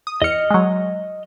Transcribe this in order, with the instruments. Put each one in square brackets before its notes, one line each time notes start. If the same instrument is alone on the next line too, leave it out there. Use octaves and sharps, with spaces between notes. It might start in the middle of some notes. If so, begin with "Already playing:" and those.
[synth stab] D#6
[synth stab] E2 C#7 [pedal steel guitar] D#5 F6
[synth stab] F#3 G#3